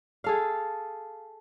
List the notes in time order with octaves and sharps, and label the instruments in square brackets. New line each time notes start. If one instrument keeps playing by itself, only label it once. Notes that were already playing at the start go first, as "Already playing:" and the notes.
[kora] G#4 A4 F5